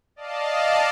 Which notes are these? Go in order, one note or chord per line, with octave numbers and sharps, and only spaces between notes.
D5 D#5 F5 A5